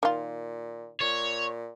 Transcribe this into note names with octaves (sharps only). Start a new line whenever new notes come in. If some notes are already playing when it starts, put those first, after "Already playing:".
A#2 D#3 F4
A#2 C#5